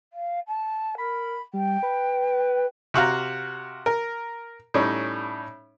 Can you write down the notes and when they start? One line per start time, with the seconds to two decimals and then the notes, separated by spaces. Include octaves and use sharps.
0.13 F5
0.47 A5
0.98 A#4 B5
1.53 G3 G5
1.83 B4
2.94 C3 F#4 F5 A#5
3.86 A#4
4.74 A2 G3 C#4 D#4